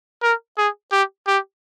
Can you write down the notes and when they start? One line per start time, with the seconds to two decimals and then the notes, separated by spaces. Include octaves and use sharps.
0.23 A#4
0.58 G#4
0.92 G4
1.27 G4